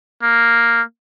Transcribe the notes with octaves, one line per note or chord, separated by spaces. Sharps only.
A#3